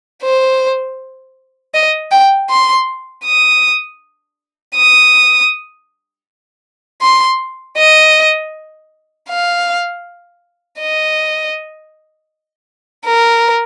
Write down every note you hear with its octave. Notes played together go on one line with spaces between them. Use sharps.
C5
D#5
G5
C6
D#6
D#6
C6
D#5
F5
D#5
A#4